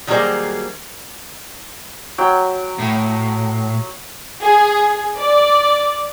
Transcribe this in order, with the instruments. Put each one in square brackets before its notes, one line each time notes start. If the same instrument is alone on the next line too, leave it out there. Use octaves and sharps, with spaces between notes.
[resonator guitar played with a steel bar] D#3 F#3 G3 A#3 G#4 C5
[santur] F#3 G5
[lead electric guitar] A2
[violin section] G#4
D5